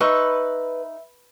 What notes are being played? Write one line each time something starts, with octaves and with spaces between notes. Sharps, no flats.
D#4 B4 E5 C6 C#6